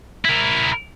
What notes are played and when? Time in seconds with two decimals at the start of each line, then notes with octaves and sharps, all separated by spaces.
0.25 E4 A#4